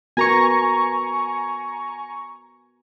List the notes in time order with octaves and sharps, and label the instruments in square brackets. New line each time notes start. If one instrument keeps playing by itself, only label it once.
[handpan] B3 F#4 A#4 [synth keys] G#5 A#5 C#6